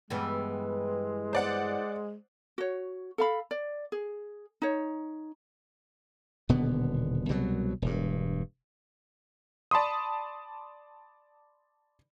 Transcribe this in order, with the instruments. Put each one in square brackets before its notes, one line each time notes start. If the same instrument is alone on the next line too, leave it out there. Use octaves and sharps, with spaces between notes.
[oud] G2 E3 B3 [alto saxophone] G#3
[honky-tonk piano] C5 D5 F#5
[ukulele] F#4 C#5
A4 F5 B5
D5
G#4
D#4 C#5
[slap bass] D#1 B2 D3 B3
C2 B2 F#3
E1 G2
[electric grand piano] D5 A5 B5 C6 D#6